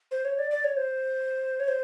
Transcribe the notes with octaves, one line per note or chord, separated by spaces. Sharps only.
C5
C#5
D5
D5
C#5
C5
C#5
C5